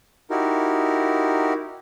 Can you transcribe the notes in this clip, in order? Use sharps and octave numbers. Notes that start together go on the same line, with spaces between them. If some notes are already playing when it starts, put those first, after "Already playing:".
D#4 E4 F#4 G4 A#4